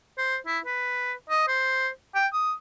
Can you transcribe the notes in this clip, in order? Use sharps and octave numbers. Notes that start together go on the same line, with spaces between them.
C5
E4
B4
D#5
C5
G5
D#6